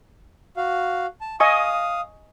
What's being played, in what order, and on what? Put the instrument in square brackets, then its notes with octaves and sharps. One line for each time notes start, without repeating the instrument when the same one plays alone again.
[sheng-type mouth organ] F#4 F5
A5
[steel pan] D#5 G#5 C#6 [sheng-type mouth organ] F5 D#6